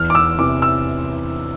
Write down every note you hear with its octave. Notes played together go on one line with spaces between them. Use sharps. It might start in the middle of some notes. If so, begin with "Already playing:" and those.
Already playing: E2 F6
D6
E6
C3 E3 D6
E6